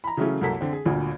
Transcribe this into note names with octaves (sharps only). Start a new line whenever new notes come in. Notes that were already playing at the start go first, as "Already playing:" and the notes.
A#5 B5
C#3 E3 F#3 A3 C#4
C2 F#2 A#3 A4 B6
D3 C4
G#4
G1 D2 A#2